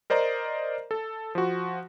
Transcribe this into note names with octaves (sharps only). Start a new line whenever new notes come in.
A#4 C5 D5 D#5 A#5
A4
F3 F#4